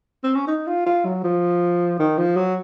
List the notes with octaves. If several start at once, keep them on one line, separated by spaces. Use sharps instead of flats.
C4
C#4
D#4
F4
F4
F#3
F3
D#3
F3
F#3